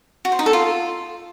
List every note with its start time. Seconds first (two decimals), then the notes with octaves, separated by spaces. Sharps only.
0.25 F#4
0.32 C5
0.39 D#4
0.46 A4
0.53 F4